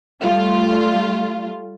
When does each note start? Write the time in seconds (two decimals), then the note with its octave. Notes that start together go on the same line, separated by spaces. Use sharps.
0.22 G3 A3 F4